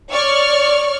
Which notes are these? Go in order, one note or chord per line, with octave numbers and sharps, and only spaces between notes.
C#5 D5 C#6 F6